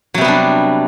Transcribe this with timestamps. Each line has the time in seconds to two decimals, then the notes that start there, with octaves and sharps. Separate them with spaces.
0.14 F#3
0.18 C3
0.21 B3
0.25 G3
0.28 D4